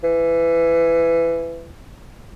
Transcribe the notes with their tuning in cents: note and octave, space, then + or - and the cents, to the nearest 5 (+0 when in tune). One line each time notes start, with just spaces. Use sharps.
E3 +20